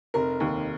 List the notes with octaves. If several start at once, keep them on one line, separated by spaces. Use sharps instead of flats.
F1 A#4
D#2